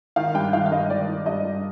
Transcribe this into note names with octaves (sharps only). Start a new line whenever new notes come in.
D#3 F5
G2 G5
D#3 F5
F5
G2 D#5
D#3 D5
D#3
G2 D#5
G2